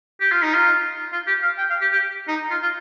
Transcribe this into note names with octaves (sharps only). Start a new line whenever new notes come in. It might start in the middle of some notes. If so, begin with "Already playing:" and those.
G4
F4
D#4
F4
F4
G4
F5
G5
F5
G4
G4
D#4
F4
F4